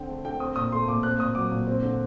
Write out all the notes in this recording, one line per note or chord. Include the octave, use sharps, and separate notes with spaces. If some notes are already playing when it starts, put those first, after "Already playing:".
Already playing: D3 C4 G5
A3
D3 G5
C4 D#6
A#2 D#6
A3 C6
A#2 D6
C4 F#6
A#2 D#6
F#3 D6
A#2
C4
D3